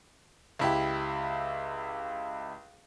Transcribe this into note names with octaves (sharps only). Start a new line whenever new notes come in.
C#2 E4 G4